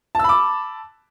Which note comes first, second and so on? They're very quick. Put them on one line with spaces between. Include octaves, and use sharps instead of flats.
A5 E6 B5 D6